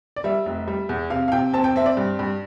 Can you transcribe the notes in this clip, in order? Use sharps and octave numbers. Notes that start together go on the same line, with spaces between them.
D5
G3 E5
F1
G3
E2
C3 F5
F5
C3 G5
C4 A5
G5
C4 E5
D5
G2
G2